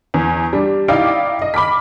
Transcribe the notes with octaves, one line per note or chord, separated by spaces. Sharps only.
E2
G3 D4
D#4 E4 D5 F5 G5 D6
D#5
B5 D6 F6 B6